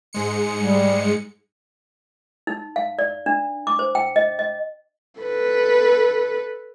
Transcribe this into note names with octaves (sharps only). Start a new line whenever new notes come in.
G#2 G#3 C#7
G3
D#4
F5
D5
D4
D6
C5
G5
D#5
D#5
A4 B4